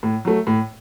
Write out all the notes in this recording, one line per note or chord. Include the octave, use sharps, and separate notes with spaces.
A2
F#3 A3
A2